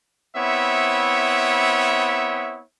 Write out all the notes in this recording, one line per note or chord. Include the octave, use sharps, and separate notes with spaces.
B3 C4 E4 C#5 E5